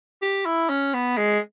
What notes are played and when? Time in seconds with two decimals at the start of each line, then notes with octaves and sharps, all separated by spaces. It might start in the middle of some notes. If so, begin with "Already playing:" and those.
0.22 G4
0.46 E4
0.69 C#4
0.94 B3
1.17 G#3